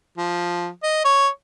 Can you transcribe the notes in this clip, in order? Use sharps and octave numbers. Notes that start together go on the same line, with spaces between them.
F3
D#5
C#5